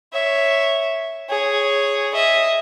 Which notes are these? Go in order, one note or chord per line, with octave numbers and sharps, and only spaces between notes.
C#5 E5
G#4 C#5
D#5 E5